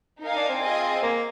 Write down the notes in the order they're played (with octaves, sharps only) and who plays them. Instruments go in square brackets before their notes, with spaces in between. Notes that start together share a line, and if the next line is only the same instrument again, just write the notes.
[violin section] D#4 A#4 F5 G#5
[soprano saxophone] D4
C4
[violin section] F4 G#4 D#5 G#5
[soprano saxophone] A#3